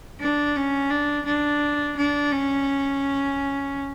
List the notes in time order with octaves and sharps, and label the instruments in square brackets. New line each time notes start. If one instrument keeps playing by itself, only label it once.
[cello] D4
C#4
D4
D4
D4
C#4